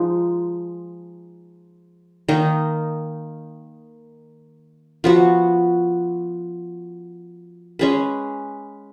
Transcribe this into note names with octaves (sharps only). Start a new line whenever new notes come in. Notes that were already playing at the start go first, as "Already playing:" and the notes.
Already playing: F3 G#3 D#4
D#3 A#3 D#4
F3 B3 F#4
G#3 C#4 G#4 B4